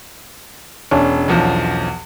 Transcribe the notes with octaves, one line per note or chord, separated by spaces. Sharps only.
E1 C#4 D4
B1 E2 F3